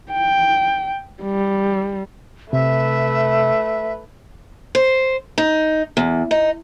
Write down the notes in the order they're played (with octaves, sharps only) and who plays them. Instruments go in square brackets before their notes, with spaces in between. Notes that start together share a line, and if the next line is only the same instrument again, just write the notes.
[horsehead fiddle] G5
G3
[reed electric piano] C3 [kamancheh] A3 B4 [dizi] E5
[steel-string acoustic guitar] C5
D#4
E2
D#4